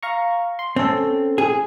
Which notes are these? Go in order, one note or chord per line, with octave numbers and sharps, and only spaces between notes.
F5 A#5 C#6
C6
C4 C#4 A4
G#4